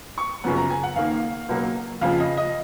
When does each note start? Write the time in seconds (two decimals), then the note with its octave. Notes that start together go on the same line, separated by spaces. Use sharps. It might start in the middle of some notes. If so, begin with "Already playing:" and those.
0.18 C#6
0.44 F#2 C#3 F3 B3
0.57 A#5
0.70 G#5
0.83 F#5
0.96 D#2 D#3 A#3 F5
1.49 C#2 B2 F#3 A#3
2.01 F2 C#3 F3 F5
2.20 D#5
2.37 D#5